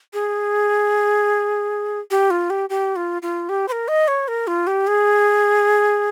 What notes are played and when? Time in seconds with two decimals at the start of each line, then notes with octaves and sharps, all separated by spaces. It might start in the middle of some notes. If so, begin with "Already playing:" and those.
0.13 G#4
2.11 G4
2.30 F4
2.50 G4
2.70 G4
2.96 F4
3.22 F4
3.49 G4
3.68 C5
3.72 A#4
3.88 D#5
4.08 C#5
4.28 A#4
4.47 F4
4.67 G4
4.87 G#4